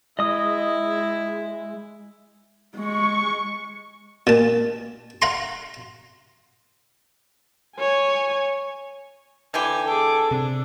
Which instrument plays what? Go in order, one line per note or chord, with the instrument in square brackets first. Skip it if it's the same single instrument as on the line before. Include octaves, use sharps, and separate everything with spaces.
[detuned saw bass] G#3 [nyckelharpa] E4 [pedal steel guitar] D#5 D#6
[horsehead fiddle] G#3 [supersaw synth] C#6
[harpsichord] A#2 A5
F5 F#5 A#5 C6
[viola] C#5 G#5
[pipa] D3 E3 G4 [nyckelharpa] G#5
[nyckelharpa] G#4 D6 [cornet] A4
[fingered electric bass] C3 C4 [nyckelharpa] D4